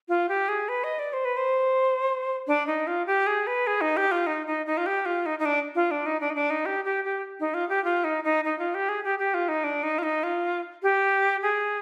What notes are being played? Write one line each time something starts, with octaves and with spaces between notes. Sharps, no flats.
F4
G4
G#4
B4
D#5
D5
C5
B4
C5
D4
D#4
F4
G4
G#4
B4
G#4
D#4
G4
F4
D#4
D#4
D#4
F4
G4
F4
D#4
D#4
D4
F4
D4
D#4
D4
D#4
D4
D#4
G4
G4
G4
D#4
F4
G4
F4
D#4
D#4
D#4
F4
G4
G#4
G4
G4
F4
D#4
D4
D#4
F4
D#4
F4
G4
G#4